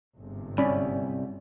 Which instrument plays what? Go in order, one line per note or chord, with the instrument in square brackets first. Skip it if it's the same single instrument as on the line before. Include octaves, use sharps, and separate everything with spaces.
[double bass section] G1 G#2 C3
[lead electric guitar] C2 [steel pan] C#4 D5 B5